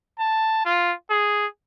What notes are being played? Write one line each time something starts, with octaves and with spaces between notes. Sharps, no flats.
A5
F4
G#4